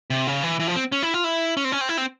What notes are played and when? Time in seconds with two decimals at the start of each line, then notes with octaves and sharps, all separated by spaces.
0.10 C3
0.27 C#3
0.43 E3
0.60 E3
0.67 F3
0.76 C4
0.92 C#4
1.02 E4
1.14 F4
1.24 E4
1.57 C#4
1.64 C4
1.72 C#4
1.81 C4
1.89 E4
1.97 C4